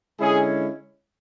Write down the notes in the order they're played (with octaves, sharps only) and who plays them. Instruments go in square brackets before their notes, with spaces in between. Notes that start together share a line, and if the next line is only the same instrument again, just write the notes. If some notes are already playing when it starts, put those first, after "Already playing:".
[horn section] D3 G#3 C#4 E4 G#4